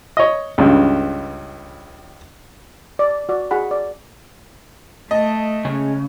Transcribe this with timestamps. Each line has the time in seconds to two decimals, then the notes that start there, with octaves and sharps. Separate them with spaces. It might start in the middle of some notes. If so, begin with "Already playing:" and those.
0.17 C#5 D#5
0.58 C#2 G2 C#3
2.99 D5
3.29 F#4 D5
3.51 F#4 G#4 F#5 B5
3.71 D5
5.11 A3 D#5 A5
5.65 C#3 G#3 C#4 G#4